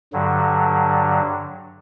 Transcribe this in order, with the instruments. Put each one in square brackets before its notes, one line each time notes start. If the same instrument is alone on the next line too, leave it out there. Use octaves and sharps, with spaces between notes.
[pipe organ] G2 D3 F#3